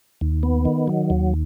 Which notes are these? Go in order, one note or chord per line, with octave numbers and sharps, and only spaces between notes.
D#2
B3
D#3
F#3
D#2